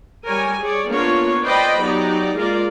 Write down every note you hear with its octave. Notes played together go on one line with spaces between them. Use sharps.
G3 A#4 C#5 G#5
G#4 C#5 D5
A#3 B3 D4 F4 C#5
B4 C5 D5 D#5 G5 B5
F#3 B3 D#4 G4 D5
G#3 A#3 F4 A#4 D5